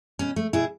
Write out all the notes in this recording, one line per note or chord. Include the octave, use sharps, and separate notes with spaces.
B2 C#4
A3
B2 E4 G#4